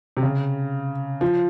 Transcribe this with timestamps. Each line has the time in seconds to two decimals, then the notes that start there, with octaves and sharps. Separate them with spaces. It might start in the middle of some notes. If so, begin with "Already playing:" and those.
0.17 C3
0.23 C#3
1.21 F3